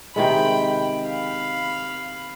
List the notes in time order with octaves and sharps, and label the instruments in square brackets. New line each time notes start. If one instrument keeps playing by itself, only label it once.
[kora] C3 D#3 G#3 [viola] G5 B5
[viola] F5 B5